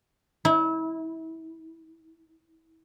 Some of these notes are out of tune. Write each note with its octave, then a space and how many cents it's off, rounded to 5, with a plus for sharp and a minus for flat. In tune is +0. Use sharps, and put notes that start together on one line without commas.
E4 -30